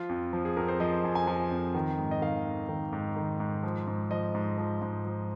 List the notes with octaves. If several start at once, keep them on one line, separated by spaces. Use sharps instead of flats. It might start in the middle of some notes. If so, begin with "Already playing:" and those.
Already playing: F3 F4
F2
F3
G#4
F2 A#4
C5
F3 D#5
F2 G#5
G#5
F3 G#5
F2
D#3
G#2
D#5
D#3 F5
G#2
D#3
G#2
D#3
G#2
F3
G#2
F3 D#5
G#2
F3
G#2
F3